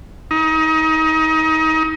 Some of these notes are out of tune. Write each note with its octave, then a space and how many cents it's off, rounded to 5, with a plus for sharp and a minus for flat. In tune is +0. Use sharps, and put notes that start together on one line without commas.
D#4 +30